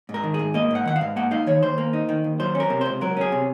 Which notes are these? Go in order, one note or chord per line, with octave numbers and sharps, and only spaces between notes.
G#2
A#4
D#3
G#2 G#4
A#3 D#5
G#2 F#5
D#3 F#5
F5
G#2
A#3 F#5
D#4 F5
D#3 C#5
D#2 C5
A#3
D#4
D#3
D#2
F#3 C5
C#4
A#4
C3
C#2 C5
F#3 A#4
C#4 G#4
C3